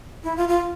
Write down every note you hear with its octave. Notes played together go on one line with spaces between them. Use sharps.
E4
F4
F4